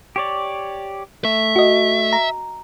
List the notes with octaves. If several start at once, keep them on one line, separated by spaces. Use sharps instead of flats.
G4 C#5 D5
A3 E5
F#4 D#5
A#5